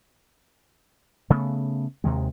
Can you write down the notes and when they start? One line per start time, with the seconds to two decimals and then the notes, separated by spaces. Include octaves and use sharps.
1.30 C#3 A3 B3
2.04 D#2 C3 D#3 G#3